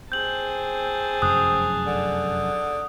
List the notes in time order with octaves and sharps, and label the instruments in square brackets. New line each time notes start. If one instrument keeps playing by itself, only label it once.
[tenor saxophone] C4 [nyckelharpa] G#4 A5 [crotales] G6 F#7
[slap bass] F1 F#2 F#3 [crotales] D#6 F#6
[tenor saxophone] D3